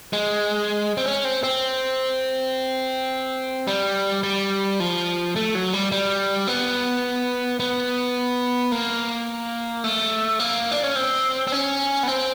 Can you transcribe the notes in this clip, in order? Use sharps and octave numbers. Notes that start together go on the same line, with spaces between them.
G#3
C4
C#4
C4
C4
G3
G3
F3
A3
F#3
G3
G3
B3
B3
A#3
A3
A#3
D4
C#4
C4
C4
C#4
B3
C4